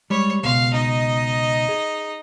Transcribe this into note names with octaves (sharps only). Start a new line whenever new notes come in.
G3 G#3 C#5 B5
C#2 B2 F5 C6
D#4 D#5
G#4